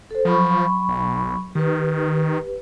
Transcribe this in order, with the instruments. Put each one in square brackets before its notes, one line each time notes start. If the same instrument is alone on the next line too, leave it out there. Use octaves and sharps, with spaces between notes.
[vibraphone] A4 C5
[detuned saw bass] F3 [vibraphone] F#3 B5 C#6
[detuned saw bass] B1
[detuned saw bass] D#3 [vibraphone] G4 B4